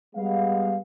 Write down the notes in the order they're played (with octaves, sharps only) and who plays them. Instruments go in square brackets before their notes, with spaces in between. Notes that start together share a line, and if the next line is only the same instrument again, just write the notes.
[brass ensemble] G3 G#3 B3 F5